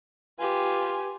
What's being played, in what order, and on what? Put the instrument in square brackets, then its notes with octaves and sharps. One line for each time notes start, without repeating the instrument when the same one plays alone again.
[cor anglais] F4 [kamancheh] G4 B4 [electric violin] G#5